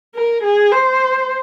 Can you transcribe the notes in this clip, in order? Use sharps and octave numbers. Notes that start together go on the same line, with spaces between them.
A#4
G#4
C5